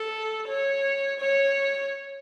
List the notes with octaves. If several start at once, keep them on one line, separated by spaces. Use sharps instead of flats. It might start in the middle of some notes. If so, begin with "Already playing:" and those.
Already playing: A4
C#5
C#5